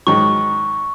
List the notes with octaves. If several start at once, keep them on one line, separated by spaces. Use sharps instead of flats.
G#2 D#3 F#3 C#6